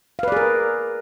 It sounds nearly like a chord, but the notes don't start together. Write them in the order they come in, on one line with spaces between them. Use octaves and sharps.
F5 B4 D5 G#4 A#4